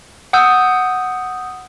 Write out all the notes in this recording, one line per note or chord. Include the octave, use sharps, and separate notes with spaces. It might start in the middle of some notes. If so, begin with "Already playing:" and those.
F#5 D#6 E6 G6